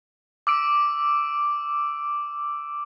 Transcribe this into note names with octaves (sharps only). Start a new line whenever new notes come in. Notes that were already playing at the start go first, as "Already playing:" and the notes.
D6 E6 D7